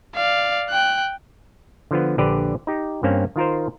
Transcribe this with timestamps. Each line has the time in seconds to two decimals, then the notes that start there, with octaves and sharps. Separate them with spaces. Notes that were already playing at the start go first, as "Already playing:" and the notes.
0.15 D5 F5
0.70 G5 F#6
1.91 D3 F3 B3
2.18 A#1 D3 G4 B4 D5
2.67 D#4 G4
3.03 G2 A#3 C4 C#4
3.36 D#3 F4 A#4 C5